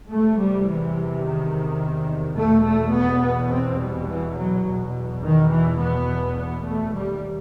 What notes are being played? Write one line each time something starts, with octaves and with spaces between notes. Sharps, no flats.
E2 C3 A3
G3
E3
D#3
E2 B2 A3
A3
B3
B3
C4
G3
E3
F#3
E2 B2
D#3
E3
B3
B3
A3
D#2 G3